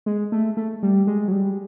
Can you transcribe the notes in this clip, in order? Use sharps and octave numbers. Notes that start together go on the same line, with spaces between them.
G#3
A3
A3
G3
G#3
F#3
G3